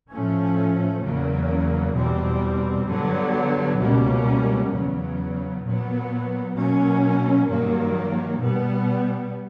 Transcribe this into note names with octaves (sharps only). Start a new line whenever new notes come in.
A2 F3 A3 C#4
E2 C#3 F#3 A#3
E2 B2 G3 C4
G2 D3 F#3 B3
C#2 B2 G3 A#3 C#4
E2 C#3 F#3 B3
A#2 F#3 B3
B2 F#3 A#3 C#4
G2 D#3 F#3 A#3
B2 G3 B3